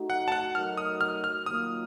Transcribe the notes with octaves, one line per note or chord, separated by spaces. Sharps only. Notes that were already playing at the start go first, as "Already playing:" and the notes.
Already playing: A3 D#4 F#4
F#5
A5
F#5
F#3 A3 D#4 F#4 A#4 F6
D#6
F6
F6
D#3 F#3 A#3 F4 D#6